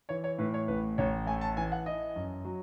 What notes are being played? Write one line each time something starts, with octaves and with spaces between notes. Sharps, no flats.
E3 C#5
C#5
A2 B4
C#5
A1 B4
A1 C#5
A3 G#5
A5
E3 G#5
F#5
E4 D#5
F#2
F#3